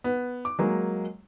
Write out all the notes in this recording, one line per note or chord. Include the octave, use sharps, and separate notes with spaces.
B3
D6
F#3 G#3 A#3